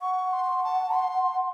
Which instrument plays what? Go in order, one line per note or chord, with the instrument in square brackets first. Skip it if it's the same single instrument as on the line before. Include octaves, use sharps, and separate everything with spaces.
[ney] F#5 [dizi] C#6
[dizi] C6
A5
C6